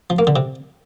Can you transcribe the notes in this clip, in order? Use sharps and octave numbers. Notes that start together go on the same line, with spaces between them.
F3
A#3
D3
C3